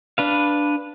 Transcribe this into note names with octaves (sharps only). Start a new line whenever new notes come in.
D4 B4 F5